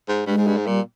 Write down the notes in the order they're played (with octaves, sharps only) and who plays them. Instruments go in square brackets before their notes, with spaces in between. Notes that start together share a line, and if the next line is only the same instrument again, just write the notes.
[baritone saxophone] G#2
[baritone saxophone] G2 [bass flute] G#3
[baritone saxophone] G#2
G2
G#2
[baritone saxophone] A#2 [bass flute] G3